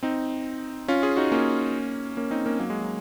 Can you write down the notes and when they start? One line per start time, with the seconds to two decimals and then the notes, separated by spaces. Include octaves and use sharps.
0.03 C4 D#4
0.88 C#4 F4
1.03 F4 G#4
1.17 D#4 F#4
1.32 A#3 C#4
2.17 A#3 C#4
2.31 C4 D#4
2.46 A#3 C#4
2.59 F#3 A#3
2.70 G#3
2.81 F#3